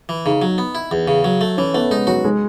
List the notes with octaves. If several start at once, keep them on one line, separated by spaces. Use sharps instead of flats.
E3
C#3 D#4
F#3
B3
E4
E2
C#3
F#3
A3
E3 C#4
A3 B3
G#3 D#4
F#3 F#4
G#3